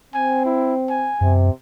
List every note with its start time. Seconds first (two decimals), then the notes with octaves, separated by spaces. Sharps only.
0.14 C4 G#5
0.46 E4
0.90 G#5
1.21 F#2 C3